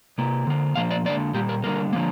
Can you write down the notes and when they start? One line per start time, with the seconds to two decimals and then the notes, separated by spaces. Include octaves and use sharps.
0.18 C3 A#3
0.47 D3 A#3
0.75 A#2 F3 A#3 F5
0.91 D5
1.05 D3 A#3 D5
1.34 A#2 G3 A#3 G4
1.49 A#4
1.64 D3 G3 A#3 A#4
1.93 D3 F3 A#3